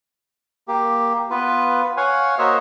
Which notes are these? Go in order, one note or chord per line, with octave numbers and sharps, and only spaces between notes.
A#3 G4
B3 F4 B4
C#5 F5 F#5 G#5
A#3 F#4 C5 C#5 D#5 E5